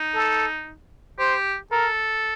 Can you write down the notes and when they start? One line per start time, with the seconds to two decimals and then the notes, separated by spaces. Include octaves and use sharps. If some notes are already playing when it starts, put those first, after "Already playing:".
Already playing: D#4
0.14 A4
1.19 G4 C5
1.72 A4 A#4